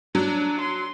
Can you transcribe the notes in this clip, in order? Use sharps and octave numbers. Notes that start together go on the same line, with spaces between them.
F#3 D4
C6